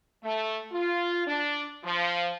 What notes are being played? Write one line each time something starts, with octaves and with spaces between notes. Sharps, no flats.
A3
F4
D4
F3